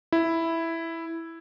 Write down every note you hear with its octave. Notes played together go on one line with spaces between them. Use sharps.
E4